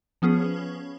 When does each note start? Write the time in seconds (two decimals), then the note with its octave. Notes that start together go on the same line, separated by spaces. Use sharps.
0.22 F3 B3 C#4 G#4